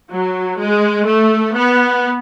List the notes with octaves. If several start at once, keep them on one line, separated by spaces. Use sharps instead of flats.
F#3
G#3
A3
B3